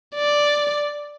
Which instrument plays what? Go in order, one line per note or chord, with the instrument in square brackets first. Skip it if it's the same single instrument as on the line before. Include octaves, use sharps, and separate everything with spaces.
[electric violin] D5